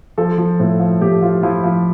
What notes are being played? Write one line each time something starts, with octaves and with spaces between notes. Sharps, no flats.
F3 A4
F3
A2
F3
A2 G4
F3 F4
F3 E4
F3